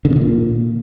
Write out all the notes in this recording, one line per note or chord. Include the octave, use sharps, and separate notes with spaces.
D3
C3
D3
A#2